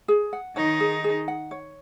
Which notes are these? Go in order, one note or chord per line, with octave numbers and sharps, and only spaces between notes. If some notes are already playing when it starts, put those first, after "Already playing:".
G#4
F#5
D#3 D#4 C#5
G#4
G#4
F#5
C#5